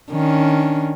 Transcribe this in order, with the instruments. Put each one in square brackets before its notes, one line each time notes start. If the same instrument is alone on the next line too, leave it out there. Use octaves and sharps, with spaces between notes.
[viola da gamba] D#3 C#4 D4